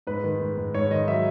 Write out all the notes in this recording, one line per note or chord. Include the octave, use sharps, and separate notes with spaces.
G#2 B4
D#3
G#2
G#2
G#2 C#5
D#3 D#5
F#3 E5